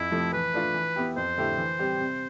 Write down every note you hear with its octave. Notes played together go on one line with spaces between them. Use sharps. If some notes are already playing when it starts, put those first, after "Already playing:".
Already playing: F2 E4
C3 F3 A3
E3 B4
A3 D4 F4
E3
B3 E4 G4
F2 C5
D3 A3 E4 G4
E3
G3 C4 G4
C3